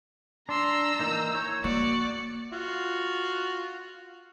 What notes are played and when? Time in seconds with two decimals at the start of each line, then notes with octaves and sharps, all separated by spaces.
0.49 D4 A#5 C6 E6
0.99 E3 A#3 D#4 G6
1.35 C#5
1.64 A#3 F#4 D5 C#7
2.53 F4 F#4